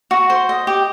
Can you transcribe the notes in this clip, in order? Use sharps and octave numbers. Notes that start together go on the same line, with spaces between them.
F#4
C5
D#5
G4